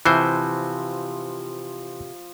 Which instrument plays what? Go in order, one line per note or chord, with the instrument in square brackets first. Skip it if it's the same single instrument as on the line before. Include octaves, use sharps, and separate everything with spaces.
[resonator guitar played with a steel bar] C3 [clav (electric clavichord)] E3 C5 [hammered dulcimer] F3